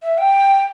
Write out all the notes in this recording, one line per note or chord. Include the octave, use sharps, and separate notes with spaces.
E5
G5